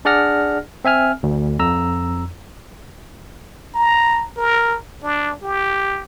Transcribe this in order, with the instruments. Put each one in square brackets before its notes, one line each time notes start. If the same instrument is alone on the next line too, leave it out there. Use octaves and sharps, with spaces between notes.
[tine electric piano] D4 G#4 D5 F#5 F6 A#6
C4 E5 G#5 F6
D2
F2 A#5 E6
[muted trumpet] A#5
A#4
D4
G4